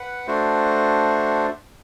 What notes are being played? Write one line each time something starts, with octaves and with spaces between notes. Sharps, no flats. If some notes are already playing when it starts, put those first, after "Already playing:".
Already playing: B4 F#5
A3 D4 F#4 C5